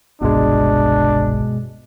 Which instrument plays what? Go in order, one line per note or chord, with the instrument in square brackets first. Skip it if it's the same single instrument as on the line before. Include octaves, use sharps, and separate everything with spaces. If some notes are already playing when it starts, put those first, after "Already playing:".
[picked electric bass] G1 C2 G2 [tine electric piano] B2 G#3 [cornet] D4